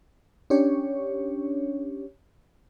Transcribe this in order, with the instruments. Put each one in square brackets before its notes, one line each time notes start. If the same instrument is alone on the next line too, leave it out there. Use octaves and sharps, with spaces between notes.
[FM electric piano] C#4 D4 G4 C#5